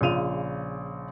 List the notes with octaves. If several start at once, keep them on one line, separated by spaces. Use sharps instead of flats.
A#1 C#3 F4 D#7 F7